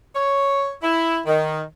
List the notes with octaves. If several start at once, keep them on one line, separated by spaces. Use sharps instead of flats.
C#5
E4
D#3